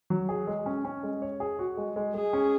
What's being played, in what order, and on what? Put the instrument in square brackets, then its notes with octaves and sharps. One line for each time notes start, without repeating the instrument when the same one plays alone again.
[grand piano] F#3
G#4
G#3
C#4
C#4
G#3
C#5
G#4
F#4
G#3
G#3
[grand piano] G#3 [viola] G#4
[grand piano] C#4